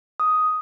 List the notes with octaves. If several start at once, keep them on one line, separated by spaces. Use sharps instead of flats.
D#6